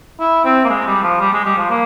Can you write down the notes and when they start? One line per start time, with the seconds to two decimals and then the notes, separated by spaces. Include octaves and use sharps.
0.20 E4
0.45 C4
0.64 A#3
0.70 G#3
0.87 G3
1.03 F3
1.20 G3
1.33 G#3
1.45 G3
1.57 F3
1.70 A#3